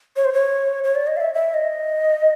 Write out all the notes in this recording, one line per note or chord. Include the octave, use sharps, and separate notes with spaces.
C#5
C5
C#5
C#5
D5
D#5
F5
E5
E5
D#5